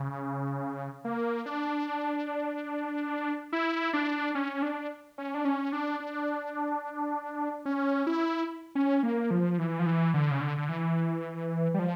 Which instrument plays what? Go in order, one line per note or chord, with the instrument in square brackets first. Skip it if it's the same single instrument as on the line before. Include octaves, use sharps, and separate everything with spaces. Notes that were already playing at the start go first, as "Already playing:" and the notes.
Already playing: [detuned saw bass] C#3
A#3
D4
E4
D4
C#4
D4
C#4
D4
C#4
D4
D4
C#4
E4
C#4
A#3
F3
E3
F3
E3
D3
C#3
D3
D3
E3
G3
F3